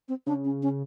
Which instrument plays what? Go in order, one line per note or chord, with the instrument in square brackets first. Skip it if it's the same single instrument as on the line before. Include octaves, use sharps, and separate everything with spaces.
[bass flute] C4
[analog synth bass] C#3 [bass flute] D4
[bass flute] C#4
C#4